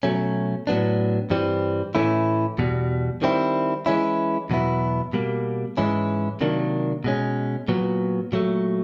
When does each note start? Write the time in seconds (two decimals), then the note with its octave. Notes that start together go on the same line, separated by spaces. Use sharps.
0.03 B2 F#3 A3 C#4
0.67 A2 F#3 B3 D4
1.30 G2 E3 G3 C4
1.95 A2 E3 A3 C#4 E4
2.58 E2 B2 G3
3.22 D#3 G3 C4 E4
3.86 E3 G#3 C#4 E4
4.50 E2 B2 F#3 B3 E4
5.13 B2 G3 A#3
5.77 G#2 E3 G#3 C#4 E4
6.41 C3 D#3 F#3 A#3 D4
7.04 B2 G#3 C#4
7.68 A#2 F#3 B3
8.32 A#2 F#3 A3